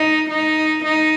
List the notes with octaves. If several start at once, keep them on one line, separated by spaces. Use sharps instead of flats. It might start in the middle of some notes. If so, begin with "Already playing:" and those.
Already playing: D#4
D#4
D#4